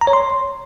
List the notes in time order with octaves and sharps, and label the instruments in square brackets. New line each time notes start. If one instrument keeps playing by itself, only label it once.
[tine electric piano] A#5
C#5
C6